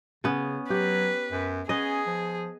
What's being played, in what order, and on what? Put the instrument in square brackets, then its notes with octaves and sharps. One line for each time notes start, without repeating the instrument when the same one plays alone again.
[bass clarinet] C#3 [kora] B3 C#4
[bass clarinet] F#3 [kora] G4 [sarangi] B4
[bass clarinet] F#2
[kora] B3 D#5 [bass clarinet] C#4 [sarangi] G#4
[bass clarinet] F3